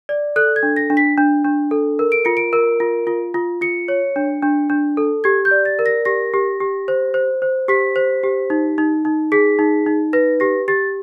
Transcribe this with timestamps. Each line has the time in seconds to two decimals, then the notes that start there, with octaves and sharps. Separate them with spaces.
0.09 D5
0.36 A4 F#6
0.56 G#6
0.63 D4
0.76 A#6
0.90 D4
0.97 B6
1.18 D4
1.45 D4
1.71 A4
1.99 A#4
2.12 D7
2.25 F4 C#7
2.37 D7
2.53 A#4
2.80 F4
3.07 F4
3.34 F4
3.61 F4 C#7
3.88 C#5
4.16 D4
4.43 D4
4.70 D4
4.97 A4
5.24 G4 G#6
5.45 G6
5.51 D5
5.65 A6
5.79 A#4
5.86 A#6
6.05 G4 A#6
6.34 G4
6.60 G4
6.88 C5
7.14 C5
7.42 C5
7.68 G4 B6
7.96 C5
8.23 G4
8.50 D#4
8.78 D#4
9.05 D#4
9.32 G#4 B6
9.59 D#4
9.86 D#4
10.13 B4 A#6
10.40 G4 A#6
10.68 G4 A6